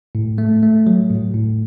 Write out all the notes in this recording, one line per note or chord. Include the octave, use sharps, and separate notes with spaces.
A2
A3
A3
F#3
A2
A2